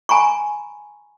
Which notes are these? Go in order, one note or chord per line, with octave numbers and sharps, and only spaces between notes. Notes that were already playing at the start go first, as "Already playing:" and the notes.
G#5 A#5 B5 C#6